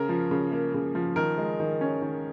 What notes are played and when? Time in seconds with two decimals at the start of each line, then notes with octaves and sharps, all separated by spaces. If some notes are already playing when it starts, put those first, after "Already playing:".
Already playing: C#3 A#4
0.09 F3
0.31 C#3
0.52 A#3
0.74 C#3
0.95 F3
1.16 D#3 A#4
1.38 G#3
1.60 D#3
1.81 C#4
2.02 D#3